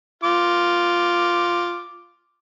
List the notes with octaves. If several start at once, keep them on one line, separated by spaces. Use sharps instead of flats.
F4 D6